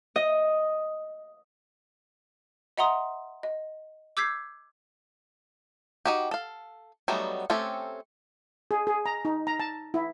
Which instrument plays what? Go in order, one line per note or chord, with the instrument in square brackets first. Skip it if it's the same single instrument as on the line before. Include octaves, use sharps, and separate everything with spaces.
[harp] D#5
[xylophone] D#5 E5 F#5 A#5 C6 D#6
D#5
D6 E6 G6 G#6 B6 C7
[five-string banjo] D#4 F#4 G4
A4 F5
F#3 G3 A3 B3 D#4
A3 C4 C#4 G4 A4
[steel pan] G#4
G#4
A#5
D#4
A#5
A5
E4